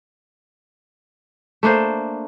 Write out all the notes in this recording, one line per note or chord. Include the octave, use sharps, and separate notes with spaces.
A3 A#3 D4 C5